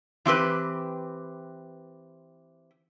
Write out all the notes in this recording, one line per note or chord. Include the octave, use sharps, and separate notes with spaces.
E3 C4 G4 B4